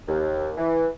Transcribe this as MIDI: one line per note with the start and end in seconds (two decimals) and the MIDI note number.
0.08 0.51 39
0.57 0.87 52